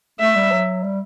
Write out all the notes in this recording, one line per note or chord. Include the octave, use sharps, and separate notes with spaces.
A3 E5
G3
F#3
G3